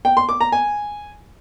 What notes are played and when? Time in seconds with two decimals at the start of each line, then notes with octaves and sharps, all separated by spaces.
0.05 G5
0.17 C6
0.29 D6
0.41 A#5
0.52 G#5